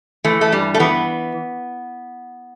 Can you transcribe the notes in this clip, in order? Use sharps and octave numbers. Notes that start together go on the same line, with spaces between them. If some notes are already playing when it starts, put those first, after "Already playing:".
E3 A3
A3
G2 G3
A3
E3 B3